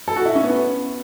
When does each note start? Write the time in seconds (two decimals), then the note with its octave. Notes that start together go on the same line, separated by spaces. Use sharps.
0.08 A4
0.16 F#4
0.25 E4
0.35 C#4
0.44 B3